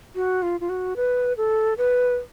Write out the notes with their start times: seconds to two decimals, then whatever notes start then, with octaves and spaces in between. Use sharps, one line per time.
0.15 F#4
0.42 F4
0.61 F4
0.69 F#4
0.96 B4
1.37 A4
1.78 B4